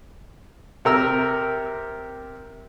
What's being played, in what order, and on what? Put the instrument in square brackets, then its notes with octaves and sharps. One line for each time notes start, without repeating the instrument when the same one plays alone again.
[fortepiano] C3 A#4 E6